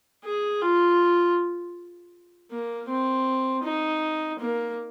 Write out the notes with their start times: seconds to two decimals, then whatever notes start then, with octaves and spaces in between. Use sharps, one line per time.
0.24 G#4
0.62 F4
2.51 A#3
2.88 C4
3.63 D#4
4.39 A#3